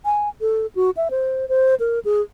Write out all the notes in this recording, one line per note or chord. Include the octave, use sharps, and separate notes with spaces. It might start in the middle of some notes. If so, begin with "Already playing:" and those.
G#5
A4
F#4
E5
C5
C5
A#4
G#4